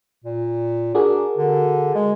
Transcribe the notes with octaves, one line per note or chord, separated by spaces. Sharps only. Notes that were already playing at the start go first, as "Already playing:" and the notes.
A#2
D4 F#4 G#4 A#4
D3
G#3